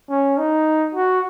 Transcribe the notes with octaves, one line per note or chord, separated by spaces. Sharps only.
C#4
D#4
F#4